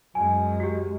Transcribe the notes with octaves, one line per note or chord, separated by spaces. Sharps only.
F#2 G#3 G#5
F#4 G4